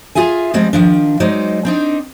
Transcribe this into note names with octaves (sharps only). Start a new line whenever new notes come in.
F4 G#4 E5 G#5
F3 G3 G#3 C4
D#3 F3 D4
F#3 G#3 D#4 C5 D5
C4 D4 D#4